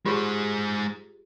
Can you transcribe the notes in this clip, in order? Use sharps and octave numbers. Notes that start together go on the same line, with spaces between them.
G#3 F4 G4 G#4 C5